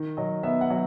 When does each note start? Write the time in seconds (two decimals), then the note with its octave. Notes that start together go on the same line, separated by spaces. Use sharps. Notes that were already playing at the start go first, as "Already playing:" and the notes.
Already playing: D#3
0.17 F#3 D#5
0.43 B3 E5
0.61 F#5
0.70 F#3